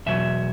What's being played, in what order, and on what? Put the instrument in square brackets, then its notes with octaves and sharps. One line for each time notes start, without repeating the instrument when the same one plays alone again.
[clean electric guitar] E2 B2 F#3 E5